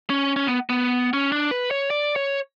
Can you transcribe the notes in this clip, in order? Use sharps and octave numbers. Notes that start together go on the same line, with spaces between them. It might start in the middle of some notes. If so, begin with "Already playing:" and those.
C#4
C#4
B3
B3
C#4
D4
B4
C#5
D5
C#5